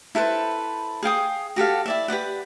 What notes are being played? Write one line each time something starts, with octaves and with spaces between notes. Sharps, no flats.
E4 A4 B4 C5
G#4 F5 G5 D#6
F#4 G4 A4 F5
E4 D5 E5
G4 B4 D5 F#5